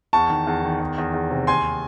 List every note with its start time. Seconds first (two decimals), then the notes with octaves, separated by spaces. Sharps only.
0.13 E2 A5 C#6
0.30 D#3
0.47 E2
0.64 D#3
0.80 E2
0.98 E2
1.14 E2
1.30 C3
1.47 D#2 G#5 C6